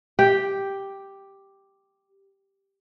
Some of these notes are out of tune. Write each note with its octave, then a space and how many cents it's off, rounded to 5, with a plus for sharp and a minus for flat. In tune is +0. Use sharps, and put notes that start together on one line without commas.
G4 +0 G5 +0